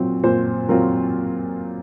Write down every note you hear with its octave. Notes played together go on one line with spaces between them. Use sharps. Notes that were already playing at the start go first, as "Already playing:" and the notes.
Already playing: A#2 F#3 C4 F4
A#2 C5
F#3 C4 F4 A#4